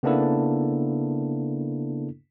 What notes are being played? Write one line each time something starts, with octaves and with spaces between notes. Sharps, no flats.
C#3 A#3 B3 D4 E4 A4